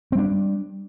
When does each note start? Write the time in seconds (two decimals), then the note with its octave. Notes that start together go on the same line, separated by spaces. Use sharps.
0.12 C4
0.15 G3
0.18 D4